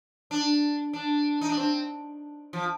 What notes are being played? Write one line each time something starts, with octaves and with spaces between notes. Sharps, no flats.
D4
D4
D#4
D4
C4
F3